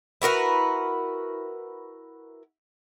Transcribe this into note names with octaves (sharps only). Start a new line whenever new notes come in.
E4 F#4 A#4 B4